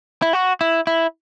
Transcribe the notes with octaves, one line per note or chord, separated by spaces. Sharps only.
E4
F#4
E4
E4